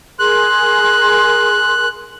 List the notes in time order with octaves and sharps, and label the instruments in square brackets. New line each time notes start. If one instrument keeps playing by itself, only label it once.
[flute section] G#4 A#4 C6 [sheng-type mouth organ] F#6